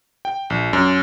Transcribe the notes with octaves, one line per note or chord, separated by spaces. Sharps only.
G5
A#1
F#2